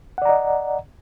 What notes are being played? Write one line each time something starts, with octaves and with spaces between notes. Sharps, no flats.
D5 D#5 F#5 A#5